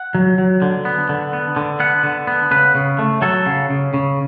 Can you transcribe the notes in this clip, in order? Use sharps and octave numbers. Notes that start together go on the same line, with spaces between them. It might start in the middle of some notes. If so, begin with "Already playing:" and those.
Already playing: F#5
F#3
F#3
D3
B3
D3
B3
D3
B3 F#5
D3
B3
C#3 B4
C#3
A3
F#3 A4
C#3
C#3
C#3